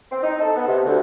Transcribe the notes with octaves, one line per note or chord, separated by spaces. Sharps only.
C4
D#4
A4
B3
C3
D2